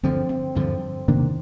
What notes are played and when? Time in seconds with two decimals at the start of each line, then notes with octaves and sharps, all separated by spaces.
0.03 G2 D3 F3 C4
0.29 C4
0.55 G2 D3 F3 C4
1.08 C3 D#3 A#3 D4